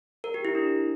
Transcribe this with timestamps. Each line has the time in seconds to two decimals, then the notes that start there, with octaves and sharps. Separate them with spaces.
0.24 A#4
0.34 G4
0.45 E4
0.55 D4